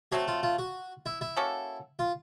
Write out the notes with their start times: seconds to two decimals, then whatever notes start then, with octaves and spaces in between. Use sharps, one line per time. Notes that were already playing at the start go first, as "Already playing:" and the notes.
0.12 F#3 A3 C4 F#4
0.28 F4
0.43 F4
0.59 F#4
1.06 E4
1.21 E4
1.37 A#3 C#4 F#4 A4
1.99 F4